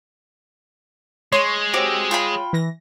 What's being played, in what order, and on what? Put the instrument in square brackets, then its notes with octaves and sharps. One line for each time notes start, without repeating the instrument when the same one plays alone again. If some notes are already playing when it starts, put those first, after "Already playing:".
[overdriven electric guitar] G#3 [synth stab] C#5 [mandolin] C6
[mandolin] C4 F#4 G4
F4 G5 B5
[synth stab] E3 A#6